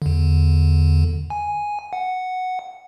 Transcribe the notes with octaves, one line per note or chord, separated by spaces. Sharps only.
E2 D3
G#5
F#5